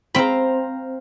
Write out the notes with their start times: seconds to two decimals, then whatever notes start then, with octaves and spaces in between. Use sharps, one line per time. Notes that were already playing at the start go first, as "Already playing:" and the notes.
0.15 C4 C5 F5 A#5 B5